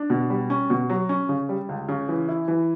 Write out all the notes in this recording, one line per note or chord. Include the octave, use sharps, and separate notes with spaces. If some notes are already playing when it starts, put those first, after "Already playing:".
Already playing: D4
B2
G3
C#4
B2
F#3
C#4
C#3
G3
C#2
C#3
E3
E4
E3